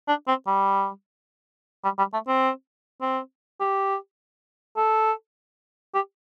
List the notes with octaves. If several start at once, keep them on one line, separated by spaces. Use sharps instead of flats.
D4
C4
G3
G3
G3
A3
C4
C4
G4
A4
G4